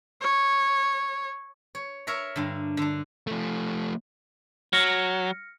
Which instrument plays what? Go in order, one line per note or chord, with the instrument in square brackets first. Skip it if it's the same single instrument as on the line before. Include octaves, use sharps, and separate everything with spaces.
[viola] C#5
[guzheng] C#5
A#4 C#5 E5 A#5
G2 D3
D3 D4
[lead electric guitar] F3 A3
[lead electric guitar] F#3 [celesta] F6 A#6 C#7